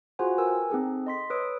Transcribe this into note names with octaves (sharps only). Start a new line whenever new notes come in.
F4 F#4 G#4 C5 F#5 G#5
A#4 B4 G5 G#5 E6
C4 D#4 G#4 A4
D#5 C6 B6
A4 B4 C#5 D#6 E6 D7